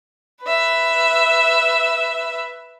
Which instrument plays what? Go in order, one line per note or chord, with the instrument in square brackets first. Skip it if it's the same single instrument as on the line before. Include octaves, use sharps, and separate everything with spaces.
[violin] B4 E5